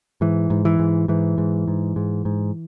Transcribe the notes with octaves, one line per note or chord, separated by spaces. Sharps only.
G#2 E3
G#2
E3
G#2
G#2 E3
G#2
G#2
G#2
G#2